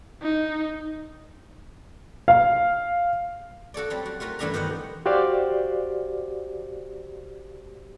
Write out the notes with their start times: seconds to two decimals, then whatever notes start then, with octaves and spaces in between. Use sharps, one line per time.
0.23 D#4
2.28 F5
3.74 F#4 A4 C#5 D5
3.90 F#3 G3 C4
4.06 F#4
4.20 A3 F4 F#4 A#4
4.39 G2 E3 A3 D4 E5 A#5
4.54 B2 D#3 G4 C5 D#5 F#5
5.06 F#4 G4 C5 D5 F5